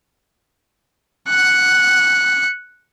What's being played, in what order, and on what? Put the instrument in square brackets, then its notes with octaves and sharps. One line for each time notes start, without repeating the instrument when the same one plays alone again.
[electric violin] F#6 C#7